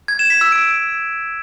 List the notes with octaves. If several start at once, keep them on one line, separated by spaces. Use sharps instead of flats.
G#6
E7
B6
E6
D7